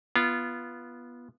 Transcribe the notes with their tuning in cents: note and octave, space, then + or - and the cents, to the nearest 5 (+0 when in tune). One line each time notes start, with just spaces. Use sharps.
B3 -15 F4 -20